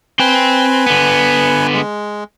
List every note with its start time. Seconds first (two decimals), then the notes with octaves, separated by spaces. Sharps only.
0.19 C4 B4 G5 G#5
0.87 D3 B3
1.74 G#3